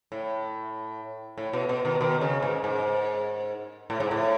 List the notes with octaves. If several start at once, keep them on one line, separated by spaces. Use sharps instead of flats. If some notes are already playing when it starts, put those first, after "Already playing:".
A2
A2
B2
B2
B2 D#3
B2 D#3
C#3
G#2
G#2
A2
G#2
A2